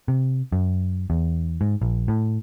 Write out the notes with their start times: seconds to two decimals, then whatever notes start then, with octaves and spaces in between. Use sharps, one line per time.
0.08 C3
0.52 F#2
1.10 E2
1.61 G#2
1.81 A#1
2.08 A2